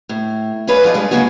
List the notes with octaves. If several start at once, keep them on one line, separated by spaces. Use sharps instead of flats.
A2
C#4 G#4 B4 C#5 D5
F#2 F3 F4 D5 D#5
G2 G3 G#3
C#3 F#3 G#3 A#3 C#4 F#4